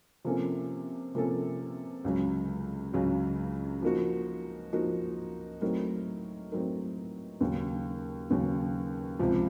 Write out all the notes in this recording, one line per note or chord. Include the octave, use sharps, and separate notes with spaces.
C3 F3 A#3 C#4 A4
C3 F3 A#3 C#4 A4
C#2 C#3 F#3
C#2 C#3 F#3
F3 A#3 D#4 F#4
F3 A#3 D#4 F#4
A2 F#3 C4 D#4 A#4
A2 F#3 C4 D#4 A#4
D#2 C#3 F#3
D#2 C#3 F#3
C#2 C3 F3